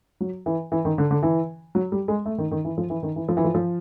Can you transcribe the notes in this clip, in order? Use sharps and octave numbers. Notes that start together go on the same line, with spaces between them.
F#3
E3
E3
D#3
D3
D3
E3
F#3
G3
G#3
A3
D#3
D#3
E3
F3
E3
D#3
E3
F3
E3
F3
F3